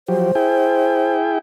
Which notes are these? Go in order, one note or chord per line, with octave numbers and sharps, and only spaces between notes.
F3 F#3 G4 C5
E4 G#4 G5